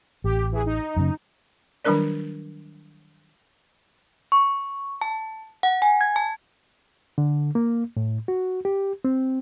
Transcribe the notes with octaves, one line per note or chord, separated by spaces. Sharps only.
A1 G4
E3 G#4
D#4
F#2 C#3
D#3 F#3 G3 D4 A#4 D5
C#6
A5
F#5
G#5
G#6
A5
D3
A#3
A2
F#4
G4
C4